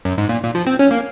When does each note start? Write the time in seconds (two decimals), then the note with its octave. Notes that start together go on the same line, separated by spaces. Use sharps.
0.05 F#2
0.18 G#2
0.29 A#2
0.43 A#2
0.55 F3
0.67 C4
0.79 C#4
0.91 A#3